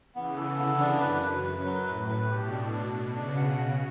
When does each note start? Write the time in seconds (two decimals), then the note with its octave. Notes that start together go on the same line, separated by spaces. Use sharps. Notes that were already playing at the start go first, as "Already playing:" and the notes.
0.15 C#3 E3 B3
0.37 A4
0.58 D3 B3
0.79 D4
1.00 F#2 B4
1.22 B4
1.43 F#2 B4
1.65 F#3
1.86 A2 B4
2.08 B4
2.29 B2 G4
2.51 D4
2.72 D4
2.93 D4
3.14 C#3 D4
3.37 F#5
3.57 C#3 F#4